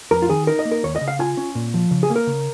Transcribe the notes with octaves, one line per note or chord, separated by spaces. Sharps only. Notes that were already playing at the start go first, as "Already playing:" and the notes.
F2 A#4
F4
D#3 G#4
D#4 A#4
D#5
A#3
A#4
D#2 C#5
D#5
C#3
F5
F4 G#5
C#4
A#2
F3
C#3
G#4
A#3
A#4
C#3